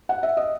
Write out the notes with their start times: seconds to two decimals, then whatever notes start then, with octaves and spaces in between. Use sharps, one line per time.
0.09 F#5
0.23 E5
0.37 D#5